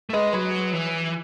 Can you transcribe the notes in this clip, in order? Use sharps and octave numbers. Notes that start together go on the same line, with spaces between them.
A3
G#3 B4 D#5
F#3 G#4 B4
E3